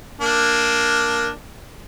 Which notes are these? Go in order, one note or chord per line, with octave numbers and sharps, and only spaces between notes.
A#3 D4